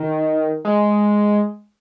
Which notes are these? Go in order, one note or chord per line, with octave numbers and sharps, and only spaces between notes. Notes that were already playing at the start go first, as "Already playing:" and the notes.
Already playing: D#3
G#3